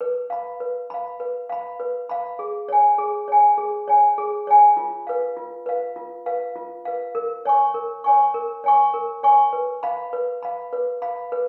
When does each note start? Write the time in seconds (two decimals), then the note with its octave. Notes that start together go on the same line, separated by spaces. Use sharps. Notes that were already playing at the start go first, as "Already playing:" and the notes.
0.01 B4
0.30 F5 B5
0.60 B4
0.90 F5 B5
1.20 B4
1.49 F5 B5
1.80 B4
2.09 F5 B5
2.39 G#4
2.69 C#5 G#5
2.98 G#4
3.28 C#5 G#5
3.57 G#4
3.88 C#5 G#5
4.18 G#4
4.47 C#5 G#5
4.77 F4
5.07 B4 F5
5.37 F4
5.66 B4 F5
5.96 F4
6.26 B4 F5
6.56 F4
6.85 B4 F5
7.15 A#4
7.45 C#5 G#5 C#6
7.74 A#4
8.04 C#5 G#5 C#6
8.34 A#4
8.64 C#5 G#5 C#6
8.94 A#4
9.23 C#5 G#5 C#6
9.53 B4
9.83 F5 B5
10.13 B4
10.42 F5 B5
10.73 B4
11.02 F5 B5
11.32 B4